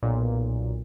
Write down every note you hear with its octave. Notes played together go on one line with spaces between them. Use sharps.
B1 A#2